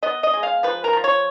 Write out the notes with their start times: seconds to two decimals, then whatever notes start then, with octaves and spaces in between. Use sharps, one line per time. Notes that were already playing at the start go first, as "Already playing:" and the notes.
0.03 B3 D#5
0.23 D#5
0.34 G#3
0.43 F5
0.63 F3 B4
0.84 A#4
0.93 F3
1.04 C#5